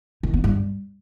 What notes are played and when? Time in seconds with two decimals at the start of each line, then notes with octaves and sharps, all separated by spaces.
0.23 D#3
0.34 B3
0.44 G2